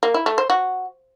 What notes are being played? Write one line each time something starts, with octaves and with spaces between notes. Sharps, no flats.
A#3
E4
A3
C5
F#4